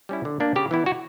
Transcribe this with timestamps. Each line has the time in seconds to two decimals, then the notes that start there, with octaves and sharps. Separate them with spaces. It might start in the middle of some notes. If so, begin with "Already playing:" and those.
0.09 G3 C#4 E4
0.25 D3
0.40 A#3 D4
0.56 C#3 G4
0.71 E3 B3 E4
0.86 F#4